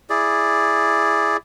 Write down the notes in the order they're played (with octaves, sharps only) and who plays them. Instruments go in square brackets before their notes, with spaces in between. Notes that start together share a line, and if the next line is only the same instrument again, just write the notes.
[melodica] E4 G#4 D5